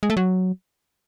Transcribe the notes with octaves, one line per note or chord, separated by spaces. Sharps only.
G#3
A3
F#3